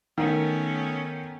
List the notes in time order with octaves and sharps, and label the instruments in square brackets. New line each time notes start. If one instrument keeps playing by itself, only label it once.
[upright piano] D#3 [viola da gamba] A3 B3 C#4